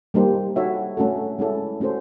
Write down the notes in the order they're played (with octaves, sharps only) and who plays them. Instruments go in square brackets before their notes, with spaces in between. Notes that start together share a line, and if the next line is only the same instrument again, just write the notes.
[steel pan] G3 A#3 D#4 G4 C5
D#4 F#4 A4 C#5 E5
A3 C#4 F#4 A4
G#3 C#4 E4 A4
A3 C#4 F#4 A4 C5